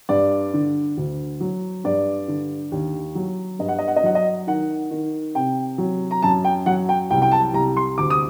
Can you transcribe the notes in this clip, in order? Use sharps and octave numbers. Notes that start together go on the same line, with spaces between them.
G2 D5
D3
D2
F#3
G2 D5
D3
D#2
F#3
G2 D#5
F#5
D#5
F#5
D#5
F#3 F#5
D#5
D#3 F#5
D#3
C3 G5
F#3
A#5
F#2 A5
G5
F#3 F#5
G5
C2 G5
G5
A5
C2 A#5
C6
D2 D6
D#6